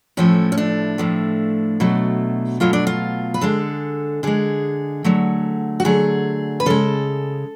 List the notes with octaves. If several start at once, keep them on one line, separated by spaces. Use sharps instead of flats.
A2 F3 A3 C#4
C#4
D4
A2 F3 A3
B2 F#3 A3
B2 F#3 A3 F4
D4
F4
B4
D3 G#3 A4
D3 G#3 G#4
D3 F#3 A3
F#4
D3 F#3 A3 G#4
B4
C#3 G#3 A4